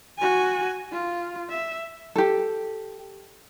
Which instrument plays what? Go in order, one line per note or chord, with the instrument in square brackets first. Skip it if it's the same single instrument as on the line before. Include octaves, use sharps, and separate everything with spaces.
[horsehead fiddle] F#4 G#5
F4
E5
[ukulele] G4 A4